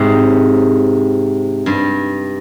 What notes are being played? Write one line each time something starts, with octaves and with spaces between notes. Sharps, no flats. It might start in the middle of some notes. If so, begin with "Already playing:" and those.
Already playing: G#2 C3
G2